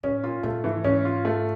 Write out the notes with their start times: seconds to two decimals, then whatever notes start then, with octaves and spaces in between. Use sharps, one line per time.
0.03 A2 C#4
0.23 A#2 F4
0.43 A#2 A3
0.64 G#2 E3
0.84 G#2 C#4
1.05 F4
1.25 A3